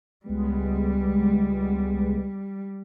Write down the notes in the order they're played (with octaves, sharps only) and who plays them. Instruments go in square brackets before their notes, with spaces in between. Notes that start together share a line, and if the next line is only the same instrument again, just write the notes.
[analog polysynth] C#2 G#3 B3 [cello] G3